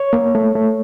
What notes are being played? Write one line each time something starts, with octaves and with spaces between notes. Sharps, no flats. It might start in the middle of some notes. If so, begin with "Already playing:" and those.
Already playing: C#5
A#3
A3
A3